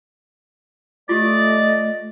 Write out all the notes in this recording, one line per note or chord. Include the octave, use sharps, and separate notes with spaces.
A3 F4 G4 D5 D#5 D6